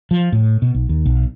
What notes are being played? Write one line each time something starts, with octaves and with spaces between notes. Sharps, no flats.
F3
A2
B2
B1
D#2
B1